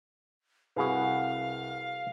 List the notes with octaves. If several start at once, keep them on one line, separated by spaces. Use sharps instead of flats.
C2 F#4 G#4 B4 F5 F#5